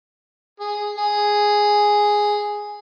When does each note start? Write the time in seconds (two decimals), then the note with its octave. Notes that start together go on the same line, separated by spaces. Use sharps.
0.60 G#4
0.98 G#4